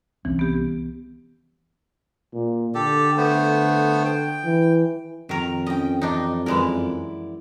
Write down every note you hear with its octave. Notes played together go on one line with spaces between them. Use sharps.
C2 E3 C4 C#4
B3 G4
A#2
D3 G4 A4
A3 B3 C5
G5
E3
F2 D#3 A#4
C#4 D#5 G5
E3 D4 D#4 D#5
F#2 E3 G#3 E4 A#4 D5